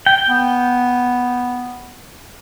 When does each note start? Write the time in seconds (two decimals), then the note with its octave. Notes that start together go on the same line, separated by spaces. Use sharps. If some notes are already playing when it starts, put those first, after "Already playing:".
0.06 G5
0.28 B3